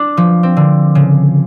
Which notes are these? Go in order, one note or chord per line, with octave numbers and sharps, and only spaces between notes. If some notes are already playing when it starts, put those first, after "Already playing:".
Already playing: D4
F3
C4
D3
C#3